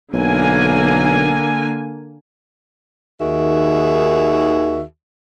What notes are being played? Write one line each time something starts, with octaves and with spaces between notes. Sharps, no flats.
B1 D3 A#3 G#5
D#2 D#3 F#4 G#4 E5